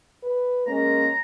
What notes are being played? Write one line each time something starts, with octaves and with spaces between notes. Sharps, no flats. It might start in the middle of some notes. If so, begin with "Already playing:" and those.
B4
G#3 A#3 C#4 A#5